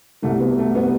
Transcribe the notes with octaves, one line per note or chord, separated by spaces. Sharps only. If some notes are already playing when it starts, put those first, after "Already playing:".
C2 B2 G3 A3
B3
A3
B2 G3 B3